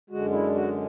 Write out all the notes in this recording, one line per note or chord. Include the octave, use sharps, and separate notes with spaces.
F#2 D3 G#3 F#4
E4
F#4